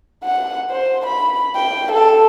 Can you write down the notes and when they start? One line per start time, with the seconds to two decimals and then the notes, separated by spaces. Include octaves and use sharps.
0.24 F#5
0.70 C5
1.06 B5
1.56 G5
1.92 A4